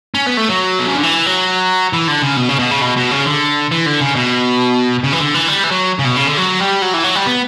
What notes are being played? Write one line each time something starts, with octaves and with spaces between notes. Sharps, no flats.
C#4
B3
A3
F#3
B2
C#3
D3
E3
F#3
E3
D3
C#3
B2
C#3
B2
C#3
B2
B2
C#3
D3
E3
D3
C#3
B2
C#3
E3
D3
E3
G3
E3
F#3
C#3
B2
C#3
D3
F#3
G3
F#3
E3
F#3
G3
B3